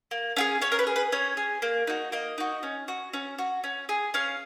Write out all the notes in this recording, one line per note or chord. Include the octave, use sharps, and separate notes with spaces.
A#3
C#4 F4 G#4
C#4 C#5
A#4
B4
G#4
B4
C#4 C#5
G#4
A#3
D#4 F#4
A#3 D#5
D#4 F#4
C#4
F#4
C#4
F#4
C#4
G#4
C#4 F5